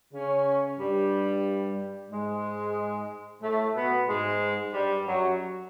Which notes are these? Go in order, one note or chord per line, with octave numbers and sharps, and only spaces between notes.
C#3 C#4
G2 G3
G#2 G#3
A2 A3
B2 B3
G#2 G#3
G2 G3
F#2 F#3